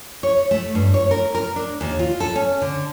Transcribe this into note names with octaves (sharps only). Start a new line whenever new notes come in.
C#5
A3
G2
C#5
A#4
A#4
D4
D#2
F4
A4
C#4
D3